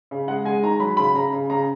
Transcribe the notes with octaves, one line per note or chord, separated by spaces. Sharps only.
C#3
G#3 F#5
G#3 G#5
D#3 A#5
F#3 B5
C#3 B5
C#3 A#5
C#3
C#3 A#5